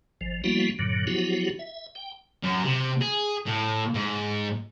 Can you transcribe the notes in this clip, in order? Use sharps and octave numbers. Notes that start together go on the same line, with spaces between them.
G#1 F3
F3 G3 A#3 B3 E4 F#4
G2 A#2 D3 F#3
F3 F#3 B3 E4 F#4 G4
E5
G5
F#2
C3
G#4
A2
G#2